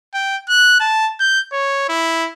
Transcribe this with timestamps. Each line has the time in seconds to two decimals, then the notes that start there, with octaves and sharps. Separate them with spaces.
0.14 G5
0.49 F#6
0.80 A5
1.20 G6
1.52 C#5
1.89 E4